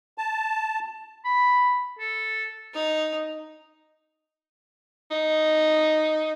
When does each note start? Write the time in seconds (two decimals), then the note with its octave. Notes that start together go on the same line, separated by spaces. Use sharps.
0.18 A5
1.25 B5
1.99 A4
2.74 D#4
5.11 D#4